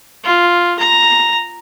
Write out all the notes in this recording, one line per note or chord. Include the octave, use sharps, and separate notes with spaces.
F4
A#5